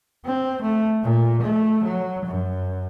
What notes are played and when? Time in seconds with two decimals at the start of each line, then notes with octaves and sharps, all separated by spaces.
0.25 C4
0.62 A3
1.03 A#2
1.42 A3
1.84 F#3
2.26 F#2